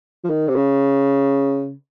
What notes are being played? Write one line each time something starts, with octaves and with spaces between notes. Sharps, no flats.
F3
D#3
C3
C#3